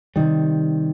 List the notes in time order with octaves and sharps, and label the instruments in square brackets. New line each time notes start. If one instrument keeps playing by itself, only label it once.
[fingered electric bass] C3 D#3 G3